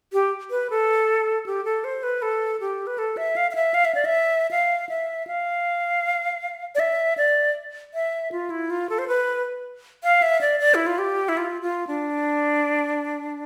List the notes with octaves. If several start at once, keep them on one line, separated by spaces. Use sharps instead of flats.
G4
B4
A4
G4
A4
C5
B4
A4
G4
B4
A4
E5
F5
F5
E5
F5
E5
D5
E5
F5
E5
F5
D5
E5
D5
E5
F4
E4
F4
A4
C5
B4
F5
E5
D5
D5
E4
F4
G4
E4
F4
F4
D4